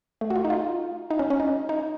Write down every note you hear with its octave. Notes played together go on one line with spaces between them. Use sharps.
A3
F#4
F4
D#4
F4
D#4
C#4
C#4
D#4
D#4